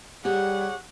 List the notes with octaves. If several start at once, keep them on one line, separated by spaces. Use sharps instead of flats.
G3 G4 G#4 C#5 F#5